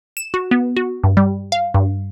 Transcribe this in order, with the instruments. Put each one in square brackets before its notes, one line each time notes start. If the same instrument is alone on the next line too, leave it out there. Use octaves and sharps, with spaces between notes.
[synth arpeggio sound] E7
F#4
B3
F#4
G2
G3
F5
G2